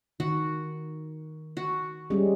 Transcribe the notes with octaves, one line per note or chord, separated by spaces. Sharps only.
D#3 F#4
F#4
G3 G#3 C#4